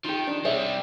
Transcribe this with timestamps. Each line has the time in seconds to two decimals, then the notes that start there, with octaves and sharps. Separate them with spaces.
0.04 D#3 F4 G4
0.27 D4
0.45 G3 C4 G#4 C#5 E5